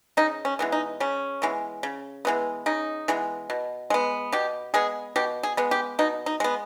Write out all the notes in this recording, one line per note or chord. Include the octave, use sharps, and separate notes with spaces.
C#3 D#4
C#4
E3 G#3 B3
D#4
C#3 C#4
E3 G#3 B3
C#3
E3 G#3 B3
C#3 D#4
E3 G#3 B3
B2
G#3 B3
B2 G4
G#3 B3 G#4
B2 G4
G#4
G#3 B3
G4
B2 D#4
D#4
G#3 B3